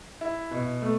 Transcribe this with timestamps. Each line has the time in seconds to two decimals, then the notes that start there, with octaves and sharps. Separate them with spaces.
0.21 E4
0.51 B2
0.82 A3